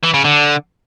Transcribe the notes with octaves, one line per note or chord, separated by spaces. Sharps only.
E3
C#3
D3